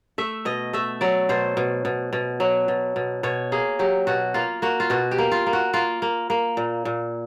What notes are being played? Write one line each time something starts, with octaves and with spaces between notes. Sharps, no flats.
A3 E5
B2 D#5
A3 E5
F#3 D5
B2 C5
B2
B2
B2
F#3
B2
B2
B2 C#5
A#3 G#4
F#3 G4
B2 F#4
A#3 F4
A#3 F#4
F4
B2 F#4
G4
A#3
F4
A#3
F#4
A#3 F4
A#3
A#3
A#2
A#2